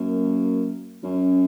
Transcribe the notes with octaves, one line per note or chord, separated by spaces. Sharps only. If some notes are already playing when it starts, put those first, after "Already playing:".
Already playing: F#2 A#3
F#2 C#4